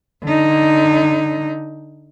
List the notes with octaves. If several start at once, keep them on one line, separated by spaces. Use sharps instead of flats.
D3 D#4